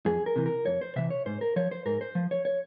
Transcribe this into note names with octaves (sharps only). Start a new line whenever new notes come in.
F2 G#4
A#4
C3 E3
A#4
F2 C#5
C5
C3 E3 E5
C#5
G#2 C5
A#4
F3 C#5
C5
G#2 A#4
C5
F3
C#5
C#5